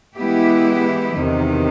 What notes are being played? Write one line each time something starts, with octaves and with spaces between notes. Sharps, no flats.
E3 G#3 B3 E4 G4
E2 C3 D#3